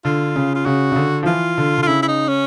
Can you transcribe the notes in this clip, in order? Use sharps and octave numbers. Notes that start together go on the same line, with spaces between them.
D3 F4
C#3
F4
C#3 F#4
C#3
D3
F3
E3 F4
D3
D3
F4
C#3 E4
E4
D#4
C#4